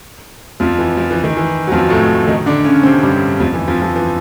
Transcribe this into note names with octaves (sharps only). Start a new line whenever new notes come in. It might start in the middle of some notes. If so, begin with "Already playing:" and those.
F2 F3
E3
F3
E3
D#3
E3
F#3
F2 F3
A2 A3
D#3 D#4
D3 D4
C#3 C#4
C3 C4
G2 G3
F2 F3
E3
F2 F3
F2 F3
E3